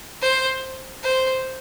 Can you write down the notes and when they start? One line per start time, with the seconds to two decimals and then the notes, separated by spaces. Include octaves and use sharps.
0.21 C5
1.03 C5